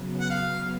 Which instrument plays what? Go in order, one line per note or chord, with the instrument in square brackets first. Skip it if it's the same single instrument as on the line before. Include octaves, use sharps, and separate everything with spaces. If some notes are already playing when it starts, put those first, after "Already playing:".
Already playing: [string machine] C#3 F#3 B3
[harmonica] F#5
F5